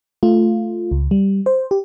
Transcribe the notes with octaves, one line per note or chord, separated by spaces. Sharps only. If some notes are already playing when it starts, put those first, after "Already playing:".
A3 F4
C#2
G3
C5
G4